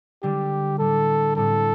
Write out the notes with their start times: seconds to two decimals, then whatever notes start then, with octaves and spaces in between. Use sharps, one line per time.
0.23 D3 G3 D4 G4
0.79 A2 G3 D4 A4
1.36 A2 G3 C4 A4